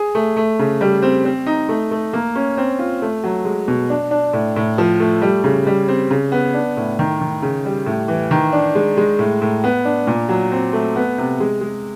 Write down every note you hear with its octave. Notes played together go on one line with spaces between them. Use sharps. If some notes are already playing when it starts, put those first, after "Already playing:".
Already playing: G#4
A3
A3
C#3
G3
C4
C4
D#4
A3
A3
A#3
C#4
C4
F4
A3
F#3
G#3
B2
D4
D4
A2
A2
F3
A3
G3
C#3
G3
C4
C#3
B3
D4
A2
D#3
D#3
C#3
G3
A2
E3
D#3
D4
G#3
G#3
A2
A2
B3
D4
A#2
F#3
C4
A3
B3
C3
G#3
G#3